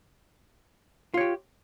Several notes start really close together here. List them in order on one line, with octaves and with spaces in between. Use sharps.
F4 C#5 G4